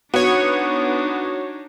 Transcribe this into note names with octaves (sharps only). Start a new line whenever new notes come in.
B3 D4 D#4 F#4 C#5